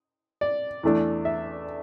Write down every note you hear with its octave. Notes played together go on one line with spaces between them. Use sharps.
D5
E2 E3 A3 D4
E5